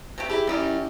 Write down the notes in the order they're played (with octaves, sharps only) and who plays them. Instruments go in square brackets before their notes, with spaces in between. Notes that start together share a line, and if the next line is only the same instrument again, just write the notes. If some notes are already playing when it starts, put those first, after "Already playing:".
[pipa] C3 A3 G4
[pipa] E4 [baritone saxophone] G4 [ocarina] G#4
[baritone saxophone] F#2 [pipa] D#3 G3 G4 [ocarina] E4